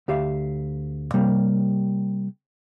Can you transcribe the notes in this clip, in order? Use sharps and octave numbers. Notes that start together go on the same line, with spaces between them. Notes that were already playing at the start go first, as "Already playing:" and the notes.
D2 G4 E5 F5
C3 G3 A#3